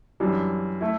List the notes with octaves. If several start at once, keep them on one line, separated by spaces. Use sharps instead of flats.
F#2 E3 G3 D4
A3 E4